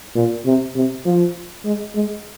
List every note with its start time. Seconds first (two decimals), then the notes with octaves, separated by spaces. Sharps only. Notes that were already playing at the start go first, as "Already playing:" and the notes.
0.15 A#2
0.46 C3
0.76 C3
1.05 F3
1.65 G#3
1.96 G#3